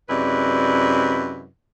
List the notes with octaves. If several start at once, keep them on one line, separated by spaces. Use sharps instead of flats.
F#2 C3 G#3 E4 B4 D5